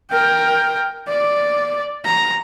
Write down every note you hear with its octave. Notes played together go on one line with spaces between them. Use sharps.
A#4 G5
D5
A#5